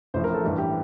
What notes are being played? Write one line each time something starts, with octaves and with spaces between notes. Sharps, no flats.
A1 A2 F3 C5
A#4
A4
A1 G2 E3 G3
G4